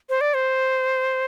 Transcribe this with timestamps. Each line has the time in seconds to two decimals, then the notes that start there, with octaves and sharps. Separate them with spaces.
0.09 C5
0.21 D5
0.34 C5